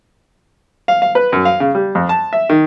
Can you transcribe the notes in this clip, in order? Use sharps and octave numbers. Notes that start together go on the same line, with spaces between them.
F5
F5
B4
F#2
F5
C#3
G3
F2
A5
E5
D#3